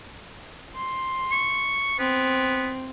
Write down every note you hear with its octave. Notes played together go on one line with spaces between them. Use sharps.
C6
C#6
B3 C4